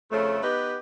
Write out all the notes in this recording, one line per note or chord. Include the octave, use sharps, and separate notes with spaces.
F2 C#3 A3
B3 D#4 G4 B4